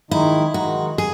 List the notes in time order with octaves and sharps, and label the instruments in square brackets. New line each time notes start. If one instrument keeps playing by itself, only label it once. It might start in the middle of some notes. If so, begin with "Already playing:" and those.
[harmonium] D#3 G#3 D#4 [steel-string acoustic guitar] E4
[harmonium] D#3 G#3 D#4 [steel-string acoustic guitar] F#4
[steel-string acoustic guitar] G#4